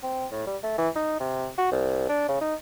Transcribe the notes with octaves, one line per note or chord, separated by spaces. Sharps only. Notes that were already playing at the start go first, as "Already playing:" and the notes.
C4
A2
G3
A3
E3
D#4
C3
F#4
C2
D4
C#3
D#4